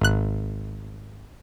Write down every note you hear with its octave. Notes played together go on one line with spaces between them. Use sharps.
G#1 F#6